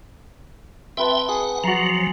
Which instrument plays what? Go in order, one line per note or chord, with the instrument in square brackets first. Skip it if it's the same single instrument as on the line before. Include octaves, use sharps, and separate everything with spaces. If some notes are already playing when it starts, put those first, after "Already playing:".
[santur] C4 B4 A5 [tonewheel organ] E5 G5
[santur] G#4 [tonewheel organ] F#5
[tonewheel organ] F3 F#3 [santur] F#4 A#5